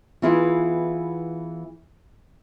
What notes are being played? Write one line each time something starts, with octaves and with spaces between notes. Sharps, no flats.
E3 B3 E4 F4 G#4